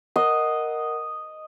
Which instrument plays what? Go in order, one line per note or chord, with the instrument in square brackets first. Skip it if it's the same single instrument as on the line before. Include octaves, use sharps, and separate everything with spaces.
[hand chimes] A#4 F#5 [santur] D#5